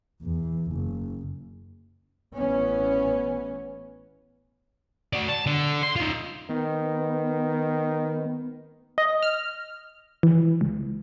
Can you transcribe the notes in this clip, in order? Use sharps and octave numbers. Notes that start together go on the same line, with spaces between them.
E2
F#1
A1 E3 B3 C#4
F#4 D5
A5
D3
C6
D#4 F4
D#3 B3
D#5
F6
E3
C#2